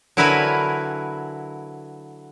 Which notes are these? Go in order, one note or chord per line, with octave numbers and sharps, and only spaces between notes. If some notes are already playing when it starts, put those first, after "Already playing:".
D3 F#3 E4 A#4 B4 G#5